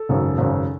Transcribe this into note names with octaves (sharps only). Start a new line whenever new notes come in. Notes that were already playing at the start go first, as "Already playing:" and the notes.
Already playing: A4
G#1 F#2 C#3
G#1 F#2 C#3